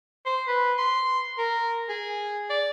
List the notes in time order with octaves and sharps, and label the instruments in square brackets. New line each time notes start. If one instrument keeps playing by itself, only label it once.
[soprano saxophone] C5
B4
C6
A#4
G#4
D5